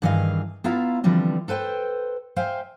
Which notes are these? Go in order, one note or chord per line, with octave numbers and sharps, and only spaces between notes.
G2 D#3 E3 G#4 D#5 F5
B3 E4 F4 E5 F5 A#5
D3 E3 F3 G3 C4
A4 B4 C5 G5
C5 E5 F5 G5 G#5